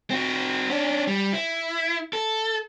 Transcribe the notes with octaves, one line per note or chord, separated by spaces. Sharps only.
C4 F#4
C#4 D4
G3
E4
A4